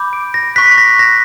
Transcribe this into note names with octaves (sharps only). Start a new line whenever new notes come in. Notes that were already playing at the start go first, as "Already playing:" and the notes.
Already playing: B5 D6 G6
D7
A#6
C#6 F#6 B6
A#6
A#6